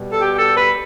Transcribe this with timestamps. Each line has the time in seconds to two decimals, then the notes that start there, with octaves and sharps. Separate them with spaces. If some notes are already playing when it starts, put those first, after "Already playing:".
Already playing: B2 G3
0.11 A4
0.20 G4
0.38 A4
0.57 B4